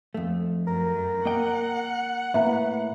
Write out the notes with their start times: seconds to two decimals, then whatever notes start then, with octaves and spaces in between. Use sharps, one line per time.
0.14 F2 A3
0.67 F#2 A#4
1.25 A#3 D#5 F#5 G5
2.34 A2 A#3 B4 E5 A#5